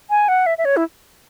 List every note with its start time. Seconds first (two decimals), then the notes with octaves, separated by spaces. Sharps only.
0.10 G#5
0.28 F#5
0.46 E5
0.58 E5
0.65 C#5
0.77 E4